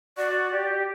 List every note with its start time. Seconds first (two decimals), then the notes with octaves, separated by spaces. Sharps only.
0.17 F#4 D5
0.52 G4